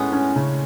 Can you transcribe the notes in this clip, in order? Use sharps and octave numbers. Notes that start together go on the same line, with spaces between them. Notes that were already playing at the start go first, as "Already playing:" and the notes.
Already playing: A2 G#3 B3 C#4
C#4
C#3